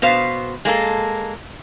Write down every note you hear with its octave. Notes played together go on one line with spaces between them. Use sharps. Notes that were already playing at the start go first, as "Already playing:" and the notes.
B2 B3 C5 F5
G#3 A#3 A4